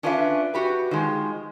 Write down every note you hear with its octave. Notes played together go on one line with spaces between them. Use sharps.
C#4 D4 F4 B4 D#5 E5
F#4 G4 B4
D#3 F3 G#3